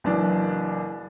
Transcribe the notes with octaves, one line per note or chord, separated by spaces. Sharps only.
F#1 F#2 E3 D4